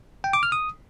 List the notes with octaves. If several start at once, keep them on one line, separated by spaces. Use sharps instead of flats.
G5
D6
F6
D#6